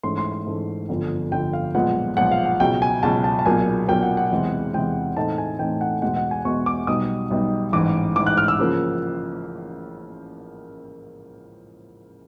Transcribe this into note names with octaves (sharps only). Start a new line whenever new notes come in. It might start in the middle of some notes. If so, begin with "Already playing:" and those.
G#2 E3 A3 C#4 C6
C6
C6
G#2 E3 A3 C#4
G1 F2 D3 F3
G1 F2 D3 F3 G5
F5
B1 A#2 F3 G#3 B3 F#5
B1 A#2 F3 G#3 B3 F#5
F5
F#5
C#2 B2 F#3 G5
G#5
C#2 B2 F#3 A5
A5
A5
B1 A#2 F#3 A#3 G#5
B1 A#2 F#3 A#3 G5
F#5
F#5
E2 C3 E3 G#3
E2 C3 E3 G#3 G5
A2 E3 A3 C4 D#4 A5
G#5
A2 E3 A3 C4 D#4 G5
F#5
E2 B2 G#3 B3 F#5
F#5
G#5
E2 B2 G#3 B3 C#6
D6
B1 B2 G3 B3 D#4 D#6
B1 B2 G3 B3 D#4
A1 G#2 E3 D6
A1 G#2 E3 D6
F#6
F6
E6
C#3 F3 A#3